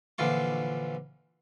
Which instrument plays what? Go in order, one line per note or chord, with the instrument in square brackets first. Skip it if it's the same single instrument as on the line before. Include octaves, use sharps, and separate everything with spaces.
[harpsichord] A#1 D3 E3 F4 C#6